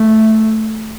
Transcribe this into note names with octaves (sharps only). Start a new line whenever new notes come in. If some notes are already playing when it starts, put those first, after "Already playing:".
Already playing: A3